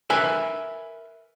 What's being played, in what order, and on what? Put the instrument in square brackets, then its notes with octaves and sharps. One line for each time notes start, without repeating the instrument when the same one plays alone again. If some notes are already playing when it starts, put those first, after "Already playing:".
[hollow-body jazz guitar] A#4 B4 E5 G#5